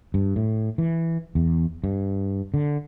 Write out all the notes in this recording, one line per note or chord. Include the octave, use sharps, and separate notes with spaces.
G2
A2
E3
E2
G2
D3